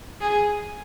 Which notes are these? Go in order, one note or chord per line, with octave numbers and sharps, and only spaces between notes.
G#4